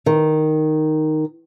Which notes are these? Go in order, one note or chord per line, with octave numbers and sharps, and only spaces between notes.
D#3